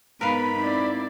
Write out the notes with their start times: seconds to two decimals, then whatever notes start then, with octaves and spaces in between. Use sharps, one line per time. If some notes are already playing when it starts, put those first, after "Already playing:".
0.21 G#2 B3 D#4 A#4 B4 F5 B5
0.59 C4 E4 D5